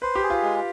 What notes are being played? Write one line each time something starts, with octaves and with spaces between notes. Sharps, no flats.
B4 C5
G4
G#4
F4
G#3